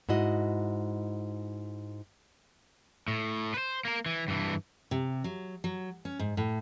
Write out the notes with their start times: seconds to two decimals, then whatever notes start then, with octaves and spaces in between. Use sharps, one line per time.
0.09 G#2 E4 F#4 D#5
3.08 A2
3.54 B4 C5
3.85 A#3 A#4
4.06 E3
4.28 G2 E3
4.91 C3
5.24 F#3
5.64 F#3
6.05 C#4
6.19 G#2
6.37 A2